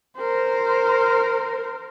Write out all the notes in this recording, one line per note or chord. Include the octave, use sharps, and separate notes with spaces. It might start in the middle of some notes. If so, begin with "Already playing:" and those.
A#4 C5